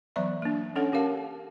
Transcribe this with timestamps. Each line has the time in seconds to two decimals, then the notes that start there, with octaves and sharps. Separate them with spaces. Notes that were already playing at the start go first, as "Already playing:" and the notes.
0.16 E3 F#3 B3 D5 E5 A#5
0.42 A#3 D4
0.76 C#4 D4 A4 C#5 F#5
0.92 C#4 G4 A#4 F5 A5